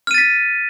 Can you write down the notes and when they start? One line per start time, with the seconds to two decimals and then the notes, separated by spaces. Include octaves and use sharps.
0.07 F6
0.11 D#7
0.14 A6
0.18 B6